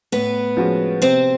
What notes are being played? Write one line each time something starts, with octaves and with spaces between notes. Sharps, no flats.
A2 B3 B4
F3 G#3 C#4 F#4
C3 C4 C5